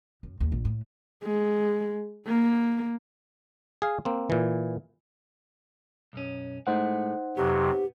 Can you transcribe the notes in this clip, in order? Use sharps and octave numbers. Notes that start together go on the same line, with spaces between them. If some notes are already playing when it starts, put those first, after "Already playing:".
F#2
D#2
A#1
A2
G#3
A#3
G#4 F5
A#3 C4
A#2 E3
B1 F#2 C#4
A2 G#3 A3 D#4 C5 F#5
F2 C3 F#3 B3 G4